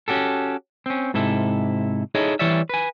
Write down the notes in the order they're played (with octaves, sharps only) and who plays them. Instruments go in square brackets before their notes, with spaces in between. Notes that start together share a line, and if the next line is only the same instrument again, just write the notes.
[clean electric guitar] C#4 F#4 G4 A4
C4 C#4
G#2 C3 E4 A4
D#4 E4 G#4 A4 C#5 D#5
E3 G3 C#5 D5 E5
B4 G#5